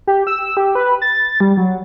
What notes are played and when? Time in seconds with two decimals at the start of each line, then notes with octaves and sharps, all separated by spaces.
0.07 G4
0.27 E6
0.57 G4
0.75 B4
1.02 A6
1.40 G3
1.57 F#3